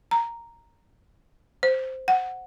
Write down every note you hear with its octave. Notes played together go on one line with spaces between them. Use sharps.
A#5
C5
F#5